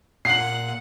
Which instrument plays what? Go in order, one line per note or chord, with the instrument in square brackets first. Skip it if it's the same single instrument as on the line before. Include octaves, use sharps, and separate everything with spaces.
[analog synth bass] A#2 [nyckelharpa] F#5 [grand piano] C7 F#7